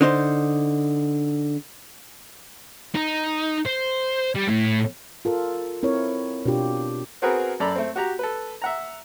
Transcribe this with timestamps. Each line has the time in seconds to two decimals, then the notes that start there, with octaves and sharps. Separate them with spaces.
0.01 D3 D#4 C5
2.95 D#4
3.65 C5
4.35 G3
4.48 A2
5.25 F4 A4 A#4
5.83 C4 E4 A#4 C#5
6.46 B2 D4 F4 G4
7.22 B3 C4 F#4 G#4 A#4 B4
7.60 F#2 A4 D5 A#5 B5
7.75 A3 C4
7.96 F#4 G4 A#5
8.19 A4 B4
8.62 E5 F#5 A#5